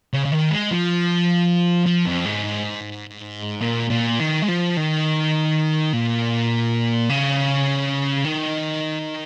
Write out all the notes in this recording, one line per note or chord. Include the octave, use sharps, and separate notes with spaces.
C#3
C#3
D#3
G#3
F3
F3
F2
G#2
A#2
A#2
D#3
G#3
F3
D#3
A#2
C#3
D#3